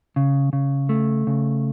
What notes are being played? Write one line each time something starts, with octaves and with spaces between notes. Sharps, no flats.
C#3
C#3
A3
C#3